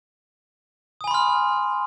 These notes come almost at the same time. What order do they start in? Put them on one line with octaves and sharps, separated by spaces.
D#6 G#5 B5 C6 F6